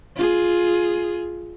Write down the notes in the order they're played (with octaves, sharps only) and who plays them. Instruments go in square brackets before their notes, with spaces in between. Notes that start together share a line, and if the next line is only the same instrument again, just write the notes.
[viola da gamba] F4 G#4